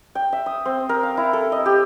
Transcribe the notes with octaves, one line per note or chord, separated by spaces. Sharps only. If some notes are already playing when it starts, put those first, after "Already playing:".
G5
E5
D#6
C4
A#4
F5
E4
A4
D#5
G4